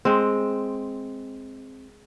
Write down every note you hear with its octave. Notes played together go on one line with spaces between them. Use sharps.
G#3 C4